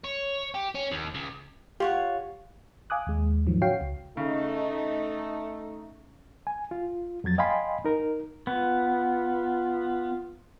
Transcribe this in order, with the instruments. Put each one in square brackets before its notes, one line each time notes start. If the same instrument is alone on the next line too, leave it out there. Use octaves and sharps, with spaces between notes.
[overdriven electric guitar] C#5
G4
C#4
D#2
C#2
[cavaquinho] F4 C#5 F#5 [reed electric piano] G4
[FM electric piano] F5 G#5 D6 D#6 F#6
D#2 G#3
G#2 D#3 F3 F#3
C#3 F#4 C#5 F5 G5 C7
C#2
[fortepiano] C#3 [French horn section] A3 D#4
[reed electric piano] G#5
F4
F2 F#3 G#6 A6
D#5 F5 G5 G#5 B5 C6
D#4 A#4
[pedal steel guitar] B3 [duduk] F4